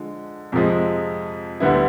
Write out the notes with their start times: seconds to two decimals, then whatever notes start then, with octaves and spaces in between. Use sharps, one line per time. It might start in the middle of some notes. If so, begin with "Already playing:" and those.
Already playing: D3 F3 G#3
0.52 F2 C3 F3 G#3
1.60 D2 D3 G3 B3 E4